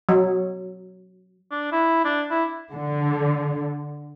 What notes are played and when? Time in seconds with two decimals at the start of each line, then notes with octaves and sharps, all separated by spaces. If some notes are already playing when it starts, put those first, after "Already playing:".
0.09 F#3
1.51 D4
1.72 E4
2.05 D4
2.30 E4
2.73 D3